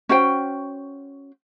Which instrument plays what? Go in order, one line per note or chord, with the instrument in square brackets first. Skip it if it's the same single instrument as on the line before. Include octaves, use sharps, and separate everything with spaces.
[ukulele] C#4 F#4 C5 G5